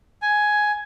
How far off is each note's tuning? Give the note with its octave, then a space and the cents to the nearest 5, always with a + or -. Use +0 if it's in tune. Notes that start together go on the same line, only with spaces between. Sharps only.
G#5 +10